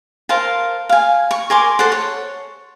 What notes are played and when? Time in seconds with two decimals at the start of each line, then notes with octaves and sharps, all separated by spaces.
0.29 A#4 C5 F5 A5
0.89 F5 G#5
1.31 C#6
1.50 A#4 G#5 C6 D6
1.79 A4 C5 F#5
1.92 C#5